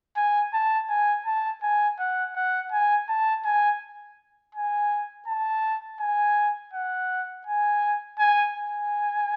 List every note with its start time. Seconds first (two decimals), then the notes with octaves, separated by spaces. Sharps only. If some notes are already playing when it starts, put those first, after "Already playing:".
0.17 G#5
0.54 A5
0.90 G#5
1.26 A5
1.63 G#5
2.00 F#5
2.36 F#5
2.72 G#5
3.09 A5
3.45 G#5
4.55 G#5
5.28 A5
6.00 G#5
6.73 F#5
7.47 G#5
8.19 G#5
8.56 G#5